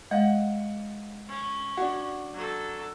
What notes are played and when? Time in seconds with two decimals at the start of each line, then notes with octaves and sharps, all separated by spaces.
0.11 G#3 D#5 F5 F#5
1.29 C#4
1.77 D4 F#4 F#5
2.34 F#3 A4